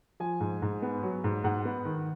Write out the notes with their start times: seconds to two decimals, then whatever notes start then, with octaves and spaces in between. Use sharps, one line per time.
0.20 F3 G#5
0.40 G#2
0.62 G#2
0.82 B3
1.03 F#3
1.24 G#2
1.44 G#2 F#5
1.65 B3
1.85 D#3